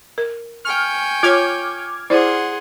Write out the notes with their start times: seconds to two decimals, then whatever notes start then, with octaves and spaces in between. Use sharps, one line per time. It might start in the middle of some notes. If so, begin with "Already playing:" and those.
0.18 A#4
0.65 G5 G#5 C#6 F6
1.23 F4 C#5 D6 F6 G#6
2.10 E4 G#4 C5 D5 F#5 C6